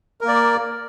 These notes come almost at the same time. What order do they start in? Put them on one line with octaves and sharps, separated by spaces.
A#4 A#3 D5